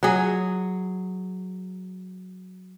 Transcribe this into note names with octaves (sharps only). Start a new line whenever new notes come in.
F#3 G#4